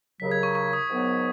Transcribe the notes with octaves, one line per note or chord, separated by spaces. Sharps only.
D#2 C#3 F#3 B6
G#6
C#6
C#6
D#6
G#2 D#3 F#3 B3